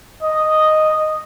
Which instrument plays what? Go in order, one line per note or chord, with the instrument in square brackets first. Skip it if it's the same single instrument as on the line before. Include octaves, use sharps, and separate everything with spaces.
[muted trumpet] D#5